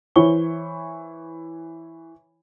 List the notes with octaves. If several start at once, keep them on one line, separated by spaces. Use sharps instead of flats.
E3 E4 C5 C#5 C#6 G7